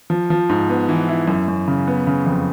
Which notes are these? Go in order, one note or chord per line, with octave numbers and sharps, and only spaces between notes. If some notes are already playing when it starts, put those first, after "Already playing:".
F3
F3
G#2
B3
E3
E4
F#2
F#2
C#3
B3
C#3
F2